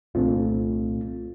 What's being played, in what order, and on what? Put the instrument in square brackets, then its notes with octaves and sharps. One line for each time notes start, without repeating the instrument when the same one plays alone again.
[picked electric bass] C2 A#2 D4 [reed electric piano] A3 C4 F4